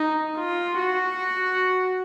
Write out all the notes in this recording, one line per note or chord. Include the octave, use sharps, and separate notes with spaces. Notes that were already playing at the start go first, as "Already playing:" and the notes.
Already playing: D#4
F4
F#4